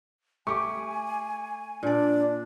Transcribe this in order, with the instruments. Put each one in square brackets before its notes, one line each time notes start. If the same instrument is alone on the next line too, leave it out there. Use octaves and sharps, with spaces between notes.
[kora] A3 G4 [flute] G#5 [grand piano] C#6 D6
[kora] A#2 D5 [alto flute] D4